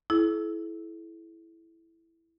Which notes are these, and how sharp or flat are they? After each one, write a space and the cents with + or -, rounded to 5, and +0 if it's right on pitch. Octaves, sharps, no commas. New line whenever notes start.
E4 +0 A4 -45